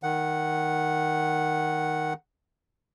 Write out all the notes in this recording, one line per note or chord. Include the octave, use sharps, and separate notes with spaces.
D#3 F#5